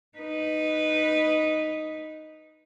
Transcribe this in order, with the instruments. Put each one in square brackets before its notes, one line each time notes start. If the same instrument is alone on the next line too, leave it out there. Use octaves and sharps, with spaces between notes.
[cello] D#4 B4